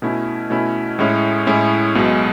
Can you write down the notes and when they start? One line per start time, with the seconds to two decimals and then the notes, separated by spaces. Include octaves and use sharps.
0.02 B2 A3 C#4 E4
0.50 B2 A3 C#4 E4
0.99 A2 G#3 C#4 E4
1.47 A2 G#3 C#4 E4
1.95 B1 B2 G#3